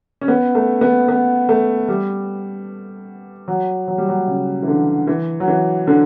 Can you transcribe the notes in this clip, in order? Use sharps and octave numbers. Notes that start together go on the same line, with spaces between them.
C#4
B3
A3
B3
B3
A3
G3
F#3
F#3
G3
F#3
C#3
E3
D3
E3
F#3
E3
D3